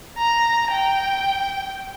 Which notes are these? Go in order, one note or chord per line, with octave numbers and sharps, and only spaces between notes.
A#5
G5